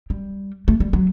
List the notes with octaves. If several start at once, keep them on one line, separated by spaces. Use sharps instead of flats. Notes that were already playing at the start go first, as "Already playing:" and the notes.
G3
A3
G3
F#3